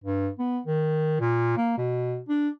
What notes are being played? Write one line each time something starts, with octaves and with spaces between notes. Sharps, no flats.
G2
B3
D#3
A#2
A#3
B2
D4